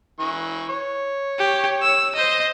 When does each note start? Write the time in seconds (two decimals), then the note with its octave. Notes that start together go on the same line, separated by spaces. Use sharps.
0.20 E3 C#6
0.69 C#5
1.38 G4
1.82 E6
2.15 C5 D#5